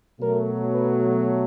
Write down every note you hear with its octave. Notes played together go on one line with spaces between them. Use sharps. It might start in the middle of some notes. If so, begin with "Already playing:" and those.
B2 F#3 A3 A#4
B4